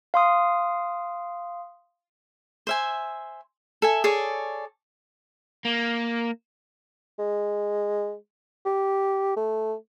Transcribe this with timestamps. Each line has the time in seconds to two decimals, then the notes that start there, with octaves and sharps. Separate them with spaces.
0.14 F5 C6 D#6
2.67 C5 E5 G#5
3.82 A4 E5 G#5
4.04 G#4 A4 C#5 D5
5.65 A#3
7.19 G#3
8.65 G4
9.37 A3